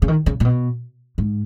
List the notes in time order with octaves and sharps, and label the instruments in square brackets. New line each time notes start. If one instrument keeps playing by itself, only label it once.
[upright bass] C#3
D#3
C#3
A#2
B2
G#2